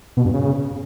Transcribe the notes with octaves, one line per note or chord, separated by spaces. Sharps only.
B2
G2
C#3